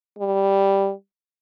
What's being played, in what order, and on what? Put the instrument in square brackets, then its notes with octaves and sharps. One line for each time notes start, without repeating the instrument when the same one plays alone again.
[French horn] G3